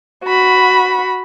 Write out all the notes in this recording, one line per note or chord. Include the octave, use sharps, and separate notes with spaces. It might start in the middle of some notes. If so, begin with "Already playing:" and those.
F#4 B5